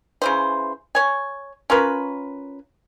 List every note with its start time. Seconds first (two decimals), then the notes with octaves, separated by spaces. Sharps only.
0.22 C#3 E3 C5
0.95 C#5 G#5
1.70 C#4 F4 A#4 B4